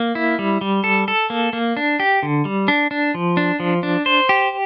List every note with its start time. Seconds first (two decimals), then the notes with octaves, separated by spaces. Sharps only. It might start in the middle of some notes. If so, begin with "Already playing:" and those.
Already playing: A#3
0.15 E4
0.39 G3
0.61 G3
0.84 A4
1.08 A4
1.30 A#3
1.53 A#3
1.77 D4
2.00 G4
2.23 D3
2.45 G3
2.68 D4
2.91 D4
3.14 F3
3.37 D4
3.60 F3
3.83 D4
4.06 C5
4.29 G4